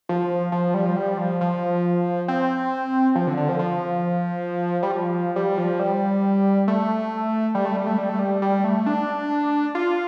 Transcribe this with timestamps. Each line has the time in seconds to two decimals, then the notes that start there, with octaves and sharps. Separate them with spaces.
0.09 F3
0.52 F3
0.74 G3
0.86 F3
0.96 G3
1.18 F3
1.41 F3
2.28 C4
3.15 F3
3.27 D3
3.37 D3
3.49 F3
3.59 F3
4.83 G3
4.92 F3
5.36 G3
5.58 F3
5.79 G3
6.68 A3
7.55 G3
7.65 A3
7.77 G3
7.87 A3
7.98 G3
8.09 A3
8.19 G3
8.42 G3
8.64 A3
8.86 D4
9.75 F4